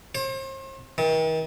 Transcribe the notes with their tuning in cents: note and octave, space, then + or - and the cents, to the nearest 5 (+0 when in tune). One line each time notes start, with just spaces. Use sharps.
C5 +40
D#3 +40